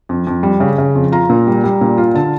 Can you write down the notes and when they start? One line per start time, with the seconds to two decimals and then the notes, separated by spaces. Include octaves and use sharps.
0.09 F2
0.27 F2
0.43 G3
0.60 C#3
0.78 C#3
0.95 F2
1.12 F4 A#5
1.30 A#2
1.47 G3
1.63 G3
1.81 A#2
1.98 F4
2.14 D3 A5